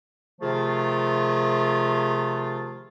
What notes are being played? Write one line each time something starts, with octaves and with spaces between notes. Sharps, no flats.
C3 D#3 F3 A3 F4 G#4